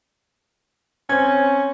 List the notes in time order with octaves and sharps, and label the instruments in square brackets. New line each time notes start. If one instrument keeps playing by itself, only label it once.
[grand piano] C4 G#6 [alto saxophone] C#4